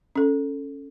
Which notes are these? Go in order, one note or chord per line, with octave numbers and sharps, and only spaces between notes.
C#4 A4